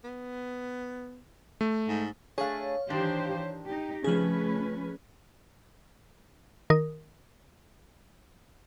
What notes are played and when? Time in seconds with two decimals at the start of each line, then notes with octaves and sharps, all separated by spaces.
0.04 B3
1.61 A3
1.88 G#2
2.38 A3 D4 G#4 C#5 F5
2.90 D#3 E3 D4 G4 C5
3.64 D#4 G4
4.04 F2 C#3 F3 A3 C#4 G#4 B4
6.70 D#3 A#4 D#6